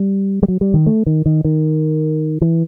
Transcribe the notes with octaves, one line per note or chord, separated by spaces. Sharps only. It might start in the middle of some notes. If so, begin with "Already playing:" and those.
Already playing: G3
G3
F#3
G3
D#3
A3
D#3
D#3
D#3
E3